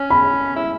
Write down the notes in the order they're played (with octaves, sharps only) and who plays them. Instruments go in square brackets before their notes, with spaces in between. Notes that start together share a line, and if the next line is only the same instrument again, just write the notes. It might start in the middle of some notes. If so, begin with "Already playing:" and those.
Already playing: [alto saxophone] C#4
[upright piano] B5
[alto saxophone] E4